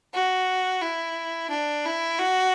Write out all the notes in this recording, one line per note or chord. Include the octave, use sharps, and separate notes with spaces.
F#4
E4
D4
E4
F#4